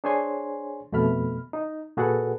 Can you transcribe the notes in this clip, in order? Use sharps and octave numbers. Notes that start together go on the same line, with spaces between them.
D4 G#4 C5 C#5 G#5 C6
F2 B2 A3 B5 F6
D#4
A#2 F#4 G#4 A4 B4 F#5